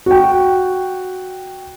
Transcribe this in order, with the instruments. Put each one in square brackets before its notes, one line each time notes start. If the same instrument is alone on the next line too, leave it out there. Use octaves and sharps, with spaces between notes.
[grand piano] F#4 G5